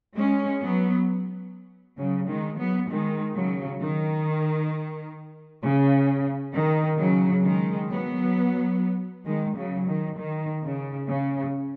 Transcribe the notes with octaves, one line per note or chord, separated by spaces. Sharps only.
G#3 C#4
F#3 B3
C#3 F#3
D#3 G#3
F#3 B3
D#3 G#3
C#3 F#3
D#3
C#3
D#3
C#3 F#3
D#3 G#3
F#3 B3
D#3 G#3
C#3 F#3
D#3
D#3
C#3
C#3